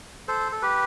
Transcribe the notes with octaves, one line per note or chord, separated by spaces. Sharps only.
A4 C5
A4
G4 B4